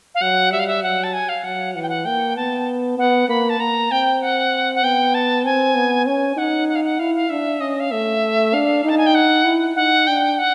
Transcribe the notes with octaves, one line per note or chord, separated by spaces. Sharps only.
F5
F#3 F#5
G3 E5
F5
E5
F#3 F#5
A5
G#5
F5
F#3 F#5
E3 F#5
G5
F#5
A#3 G5
B3 A5
B3 F#5
A#3 B5
A5
A#3 A#5
C4 G5
F#5
F#5
B3 G5
A5
C4 G#5
B3
C#4 G#5
D#4 F#5
F#5
F5
F#5
E4 F5
F5
D4 E5
C#4 D#5
F5
A3 E5
D4 F5
D#4 A5
G#5
G5
F#5
E4
D#4 F#5
D4 G5
F#5